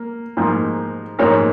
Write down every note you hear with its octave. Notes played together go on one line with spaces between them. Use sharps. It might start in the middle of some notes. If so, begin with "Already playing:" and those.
Already playing: A#3
G#2 F3 A#3
G#2 F3 A#3 A#4 C#5